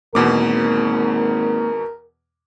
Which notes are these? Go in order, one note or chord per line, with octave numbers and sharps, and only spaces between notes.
G#1 E2 B2 A#3 A#4 D6